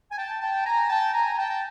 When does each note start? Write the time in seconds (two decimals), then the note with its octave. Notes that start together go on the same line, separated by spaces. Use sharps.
0.11 G#5
0.17 G5 A5
0.42 G5 A5
0.65 G#5 A#5
0.90 G5 A5
1.14 G#5 A#5
1.38 G5 A5